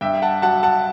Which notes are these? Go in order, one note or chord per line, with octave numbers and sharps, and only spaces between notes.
G2 E5 G5
F#5 A5
F#3 F#5 A5
F#5 A5